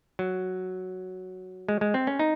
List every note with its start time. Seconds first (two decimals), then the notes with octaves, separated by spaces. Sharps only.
0.19 F#3
1.69 G#3
1.81 G#3
1.94 C4
2.07 C#4
2.19 D#4